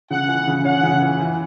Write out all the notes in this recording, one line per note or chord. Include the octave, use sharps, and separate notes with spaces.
C#3 F#5
E3
C#3
C#4 F#5
C#3
E3
E3